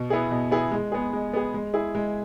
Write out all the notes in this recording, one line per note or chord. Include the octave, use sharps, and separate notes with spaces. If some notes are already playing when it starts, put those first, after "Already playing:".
Already playing: B2
B3 E4 G#4
B2
B3 E4 G#4
G#3
B3 G#4
G#3
B3 G#4
G#3
E4 G#4
G#3